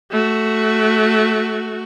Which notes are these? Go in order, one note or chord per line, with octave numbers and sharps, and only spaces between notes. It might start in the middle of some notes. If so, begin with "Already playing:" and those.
A3 F#4